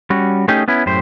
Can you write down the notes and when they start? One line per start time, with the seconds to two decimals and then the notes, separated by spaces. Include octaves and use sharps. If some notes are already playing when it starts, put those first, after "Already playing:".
0.10 G3 C#4 F#4
0.48 A3 C#4 D#4 G4 G#4
0.68 B3 C#4 E4
0.86 F#2 A2 G4 C5